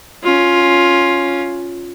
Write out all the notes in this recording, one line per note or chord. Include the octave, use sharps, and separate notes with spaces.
C#4 F4